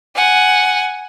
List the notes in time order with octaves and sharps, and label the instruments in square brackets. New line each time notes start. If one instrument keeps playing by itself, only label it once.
[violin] F#5 G#5